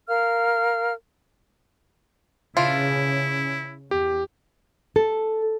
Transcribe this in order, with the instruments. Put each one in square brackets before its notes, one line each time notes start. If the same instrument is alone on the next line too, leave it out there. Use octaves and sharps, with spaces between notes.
[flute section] A#4 F5 F6
[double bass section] C#3 C#4 [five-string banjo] E3 D4 F4 [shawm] E4
[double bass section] E2 [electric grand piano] G4
[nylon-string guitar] A4